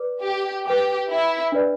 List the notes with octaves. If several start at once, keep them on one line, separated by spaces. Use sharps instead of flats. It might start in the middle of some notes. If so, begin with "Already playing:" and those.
Already playing: B4 D5 D6
G4
G4 B4 G5 D6
E4
D4 B4 D5